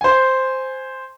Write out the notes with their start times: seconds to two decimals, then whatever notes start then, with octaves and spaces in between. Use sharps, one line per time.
0.01 C5 G#5